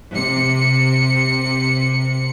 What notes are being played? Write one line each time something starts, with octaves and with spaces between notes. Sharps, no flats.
C3 C#7